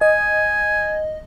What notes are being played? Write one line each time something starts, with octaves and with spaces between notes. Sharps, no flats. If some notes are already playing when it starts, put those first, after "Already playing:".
D#5 G#5